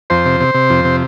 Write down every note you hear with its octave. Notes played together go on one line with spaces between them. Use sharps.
F2 C5
C3
C3
C3
F2
C3